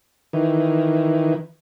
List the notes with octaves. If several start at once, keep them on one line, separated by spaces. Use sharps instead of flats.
D#3 E3